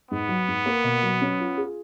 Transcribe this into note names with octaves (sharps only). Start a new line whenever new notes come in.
G#2 B3
F#3
G#2
A#3
B2
F#3
C#4
F4
G#4